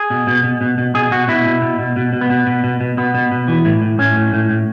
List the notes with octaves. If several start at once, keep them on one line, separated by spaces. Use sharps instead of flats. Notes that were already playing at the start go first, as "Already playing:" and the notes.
Already playing: G#4
B2
B2
B2
B2
B2
B2 G#4
B2 F#4
B2 E4
B2
B2
B2
B2
B2
B3
B2
B2
B2
B2
B2 B3
B2
B2
E3
A2
A2
A2 C#4
A2
A2
A2